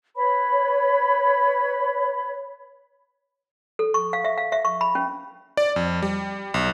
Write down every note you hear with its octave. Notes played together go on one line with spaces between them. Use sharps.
B4 C#5 B5
A4
C#6
F5
E5
F5
E5
C#6
B5
C#4
D5
F2
G3
B1